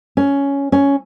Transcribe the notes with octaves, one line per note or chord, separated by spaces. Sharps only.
C#4
C#4